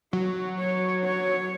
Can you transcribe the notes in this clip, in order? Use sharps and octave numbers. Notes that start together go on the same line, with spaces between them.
F#3 F#4
C#5
C#5